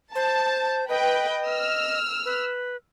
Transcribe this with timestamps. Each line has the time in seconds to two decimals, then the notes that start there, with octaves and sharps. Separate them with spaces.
0.15 C5 A5
0.89 B4 D#5 G5
1.47 E6 F6
2.25 B4